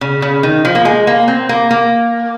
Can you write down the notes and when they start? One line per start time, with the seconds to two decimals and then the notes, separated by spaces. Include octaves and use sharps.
0.01 C#3
0.22 C#3
0.43 D#3
0.65 F3
0.75 A#3
0.85 G#3
1.07 A#3
1.28 C4
1.49 A#3
1.71 A#3